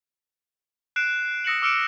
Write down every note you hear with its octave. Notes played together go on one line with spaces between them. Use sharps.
F#6 C7 D7 E7
D#6 E6 A#6 C#7 E7 F#7
D6 E6 F6 C#7 D7 E7